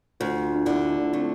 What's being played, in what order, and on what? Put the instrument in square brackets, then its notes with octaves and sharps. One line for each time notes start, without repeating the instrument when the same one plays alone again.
[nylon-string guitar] D2 [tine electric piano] F4
[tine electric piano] F4
D4
[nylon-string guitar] D3 [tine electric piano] E4
[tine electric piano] D4
[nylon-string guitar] A3 [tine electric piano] C4